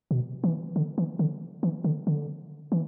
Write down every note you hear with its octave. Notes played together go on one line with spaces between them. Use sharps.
B2
E3
D3
E3
D3
E3
D3
D3
E3